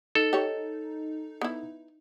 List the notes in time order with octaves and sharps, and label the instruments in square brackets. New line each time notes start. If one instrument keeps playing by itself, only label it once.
[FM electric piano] D#4 [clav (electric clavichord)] A4
[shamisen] G4 C#5
B3 E4